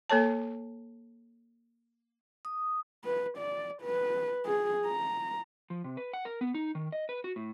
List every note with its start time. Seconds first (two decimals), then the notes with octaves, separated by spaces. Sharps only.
0.10 A#3 A4 C#5 A5
2.45 D#6
3.05 B4
3.38 D5
3.82 B4
4.46 G#4
4.86 A#5
5.70 F3
5.84 C3
5.97 B4
6.13 F#5
6.25 A#4
6.41 B3
6.54 D#4
6.75 D#3
6.92 D#5
7.09 B4
7.24 F#4
7.36 A2